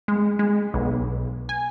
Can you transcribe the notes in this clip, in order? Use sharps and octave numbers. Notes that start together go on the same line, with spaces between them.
G#3
G#3
B1
G#5